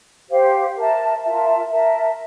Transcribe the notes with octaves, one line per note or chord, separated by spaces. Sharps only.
G4 C5 F5
A#4 E5 A5
F4 A#4 E5 A5
A#4 E5 A5